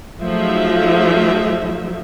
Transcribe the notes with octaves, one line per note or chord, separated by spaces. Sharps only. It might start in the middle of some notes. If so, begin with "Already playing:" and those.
F3 F#3 A3 D#4 G#4 E5